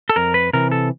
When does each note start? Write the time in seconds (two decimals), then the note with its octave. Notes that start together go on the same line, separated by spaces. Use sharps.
0.09 A4
0.16 F2 A#4
0.34 B4
0.53 C3 E3 A#4
0.72 A4